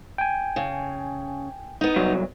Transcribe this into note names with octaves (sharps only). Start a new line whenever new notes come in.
G5 G#5
C#3
B3 D#4
C2 F#3